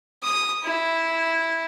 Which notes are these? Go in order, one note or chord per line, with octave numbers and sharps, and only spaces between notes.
D#6
E4